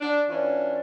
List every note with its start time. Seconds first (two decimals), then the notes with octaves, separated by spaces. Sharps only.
0.01 D4
0.29 E3 C#4 D4 F4